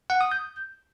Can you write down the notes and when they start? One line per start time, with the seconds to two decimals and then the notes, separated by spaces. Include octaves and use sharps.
0.10 F#5
0.21 D#6
0.32 G6